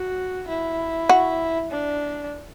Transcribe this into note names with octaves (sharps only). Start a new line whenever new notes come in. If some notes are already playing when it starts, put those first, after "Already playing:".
Already playing: F#4
E4
F#4
D4